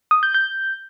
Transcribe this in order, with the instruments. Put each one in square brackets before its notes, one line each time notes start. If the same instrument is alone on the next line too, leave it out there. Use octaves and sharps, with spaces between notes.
[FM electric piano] D#6
G6
G6